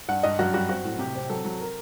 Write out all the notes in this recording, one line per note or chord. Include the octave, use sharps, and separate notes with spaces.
G2 F#5
G2 D#5
F#2 F#4
G3 F#4
C4 F#4
A2
C3 G4
C4
F#3 A4
F#3
A#4